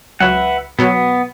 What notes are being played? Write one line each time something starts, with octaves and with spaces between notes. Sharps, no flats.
C#2 F#3 B4 E5 F#5
B2 F#3 B3